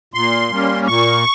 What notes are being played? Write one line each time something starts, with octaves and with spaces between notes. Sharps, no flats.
A#2 C6
G3 A#3 C#4
A#2 C#6